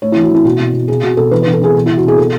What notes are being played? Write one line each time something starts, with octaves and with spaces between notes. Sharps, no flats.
A2 C#5
E4
E3
F#4
E3 E4
B2 F#4
B2
B2
B2 G#4
B2 F#4
B2 A4
E3 B4
B4
E3
A4
E3 G#4
B2
E4
B2
F#4
B2 G#4
B2 A4